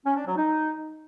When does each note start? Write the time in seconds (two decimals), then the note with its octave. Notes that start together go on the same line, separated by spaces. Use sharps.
0.05 C#4
0.16 D4
0.26 F#3
0.37 D#4